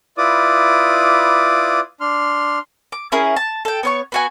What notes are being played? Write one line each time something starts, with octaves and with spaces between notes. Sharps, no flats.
E4 F4 B4 D5 D6 D#6
D4 C6 F6
D6
C#4 E4 G#4 A#4
A5
A4 G5
B3 C#5 C#6
B3 F#4 G#5